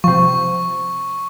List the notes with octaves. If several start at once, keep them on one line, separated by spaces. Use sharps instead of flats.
C3 F3 C#6